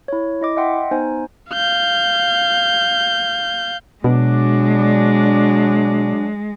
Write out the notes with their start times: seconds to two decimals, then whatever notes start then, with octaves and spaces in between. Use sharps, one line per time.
0.08 E4 C#5
0.41 E4 D#5 D6
0.57 D#5 E5 F#5 G5 C6
0.91 B3 D#4 C5 G#5
1.51 F5 G6
4.04 B2 F#3 G#3 D4